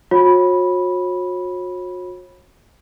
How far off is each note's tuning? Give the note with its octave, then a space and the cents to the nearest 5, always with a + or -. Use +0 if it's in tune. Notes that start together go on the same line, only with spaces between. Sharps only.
F#4 -40 C#5 -40 B5 -10